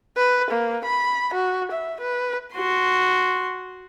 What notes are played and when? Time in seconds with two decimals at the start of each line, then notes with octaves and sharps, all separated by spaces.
0.17 B4
0.51 A#3
0.85 B5
1.34 F#4
1.72 E5
2.00 B4
2.54 F#4 C6